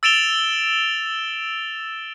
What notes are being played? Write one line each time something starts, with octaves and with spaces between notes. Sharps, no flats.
E6 A6 D7 E7 F7 G7